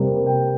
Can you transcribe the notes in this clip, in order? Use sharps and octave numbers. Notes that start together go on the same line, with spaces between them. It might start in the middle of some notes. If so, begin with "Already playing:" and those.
Already playing: C3 G3 A#3
G5